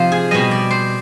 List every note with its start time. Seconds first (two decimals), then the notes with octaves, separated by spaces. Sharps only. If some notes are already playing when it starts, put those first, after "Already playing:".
Already playing: C3 F3 D#4 C5
0.12 G#4
0.31 B2 G3 D#5
0.51 D5
0.70 C5